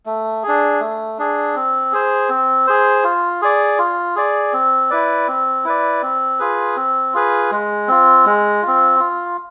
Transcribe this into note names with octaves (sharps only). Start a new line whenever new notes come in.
A3
D4 G#4
A3
D4 G#4
C4
G#4 C5
C4
G#4 C5
F4
G#4 D5
F4
G#4 D5
C4
E4 B4 D5
C4
E4 B4 D5
C4
F4 G#4 B4
C4
F4 G#4 B4
G#3
C4 F4
G#3
C4 F4
F4